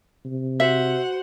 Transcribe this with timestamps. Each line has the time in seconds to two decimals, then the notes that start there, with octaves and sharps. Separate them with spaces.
0.25 C3
0.60 F#4 C5 E5 F#5